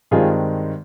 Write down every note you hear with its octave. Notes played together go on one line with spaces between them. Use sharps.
G2 D#3 G#3 C4 F4 G#4